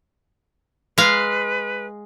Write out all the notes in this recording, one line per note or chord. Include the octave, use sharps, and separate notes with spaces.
G#3 B4 F5